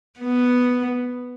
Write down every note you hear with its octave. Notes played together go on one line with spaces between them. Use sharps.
B3